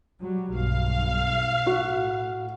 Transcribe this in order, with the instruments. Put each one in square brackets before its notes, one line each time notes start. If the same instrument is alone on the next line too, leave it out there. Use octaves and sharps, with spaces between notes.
[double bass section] F#3 G3
[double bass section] B1 G2 [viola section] F5
[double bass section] A2 [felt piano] F#4